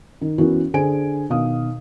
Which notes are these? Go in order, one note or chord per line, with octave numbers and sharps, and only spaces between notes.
D#3
E3 B3 C#4 E4 F#4 A#4
D3 D4 G#4 C5 G#5 D7
B2 D#3 F5 D#6